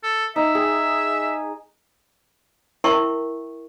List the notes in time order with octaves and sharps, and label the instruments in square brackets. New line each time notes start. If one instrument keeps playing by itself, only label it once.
[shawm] A4
[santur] D#4 [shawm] E5
[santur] G#4
[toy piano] E4 A#4 E5 G5 C6 C#6